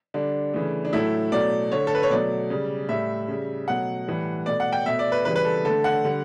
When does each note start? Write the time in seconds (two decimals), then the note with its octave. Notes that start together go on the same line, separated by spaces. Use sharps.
0.14 D3 G3 D4
0.54 C#3 E3 A3
0.85 D4
0.93 A2 F#3 A3 E4
1.32 B2 F#3 A3 D5
1.72 D3 A3 C#5
1.87 A4
1.95 B4
2.03 C#5
2.10 B2 F#3 A3 D5
2.50 C#3 G3
2.89 A2 G3 E5
3.28 C#3 G3
3.68 B2 F#3 A3 F#5
4.07 A2 E3 G3
4.46 B2 A3 D5
4.60 F#5
4.73 G5
4.86 B2 A3 E5
4.99 D5
5.12 B4
5.25 C#3 E3 G3 B4
5.36 B4
5.45 A4
5.65 D3 A3 A4
5.84 F#5
6.04 D3 G3